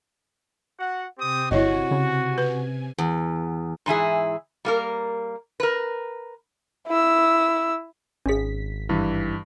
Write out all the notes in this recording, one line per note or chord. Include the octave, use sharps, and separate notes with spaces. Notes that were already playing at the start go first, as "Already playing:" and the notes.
F#4 F#5
C3 C4 G4 G#5 D#6
G1 E4 F#4 C#5 D#5
C#3
B4
E2
G#2 E3 E4 G#4
G3 A#3 A#4
A#4 B4
E4 E6
G#1 C#4 G#4 B6
G2 E3